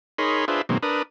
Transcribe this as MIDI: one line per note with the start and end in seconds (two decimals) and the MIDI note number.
0.18 0.45 63
0.18 0.45 68
0.18 0.45 70
0.18 0.45 73
0.18 0.45 83
0.18 0.45 84
0.48 0.62 62
0.48 0.62 65
0.48 0.62 68
0.48 0.62 71
0.48 0.62 72
0.48 0.62 76
0.69 0.78 47
0.69 0.78 51
0.69 0.78 54
0.69 0.78 56
0.69 0.78 58
0.69 0.78 60
0.83 1.02 62
0.83 1.02 70
0.83 1.02 71
0.83 1.02 87